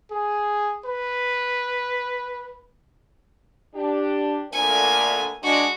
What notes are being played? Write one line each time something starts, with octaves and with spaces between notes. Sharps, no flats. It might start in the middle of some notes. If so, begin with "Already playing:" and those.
G#4
B4
D4 G4
D2 A#2 A#4 G#5
G#3 D4 F#4